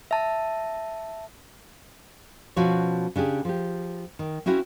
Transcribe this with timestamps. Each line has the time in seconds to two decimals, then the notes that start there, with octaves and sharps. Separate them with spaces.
0.11 E5 A5
2.56 B2 F3 C#4 F#4 C#5
3.16 C#3 D4 G4 G#4
3.45 F3 G4
4.19 D#3
4.46 C4 C#4 E4 F#4 F5